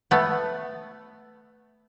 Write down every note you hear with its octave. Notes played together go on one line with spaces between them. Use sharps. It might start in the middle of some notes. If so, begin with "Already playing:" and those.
A3 B3